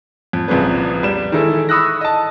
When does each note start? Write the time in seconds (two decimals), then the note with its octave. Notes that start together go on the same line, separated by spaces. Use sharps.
0.33 F2
0.48 C2 F2 A#2 C#3 B3
1.03 G3 E7
1.32 D#3 E3 G#3 E4 A4
1.69 B5 C#6 D#6 E6 F#6 A#6
2.01 D#5 A5